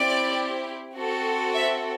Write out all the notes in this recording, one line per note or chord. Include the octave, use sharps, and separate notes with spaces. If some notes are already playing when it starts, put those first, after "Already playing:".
Already playing: C4 E4 G4 D5
C4 F#4 A4
E5